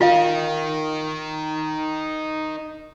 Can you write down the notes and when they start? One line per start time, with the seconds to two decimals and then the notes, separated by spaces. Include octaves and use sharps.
0.01 D#4 F4 A#4 D#5 F5